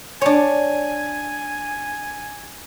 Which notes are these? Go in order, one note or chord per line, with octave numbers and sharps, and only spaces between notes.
D4 C#5 G#5